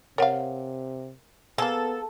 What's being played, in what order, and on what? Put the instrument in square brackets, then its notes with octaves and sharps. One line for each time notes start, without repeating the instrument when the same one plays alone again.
[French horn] C3 [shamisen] A#4 F5 [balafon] C#5 F#5
[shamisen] G#3 A#3 [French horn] B3 [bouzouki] A4